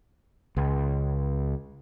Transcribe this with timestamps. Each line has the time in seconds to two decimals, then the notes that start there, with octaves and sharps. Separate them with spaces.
0.57 C#2